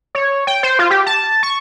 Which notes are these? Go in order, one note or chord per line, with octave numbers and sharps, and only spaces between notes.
C#5
G5
C5
F4
G4
A5
C#6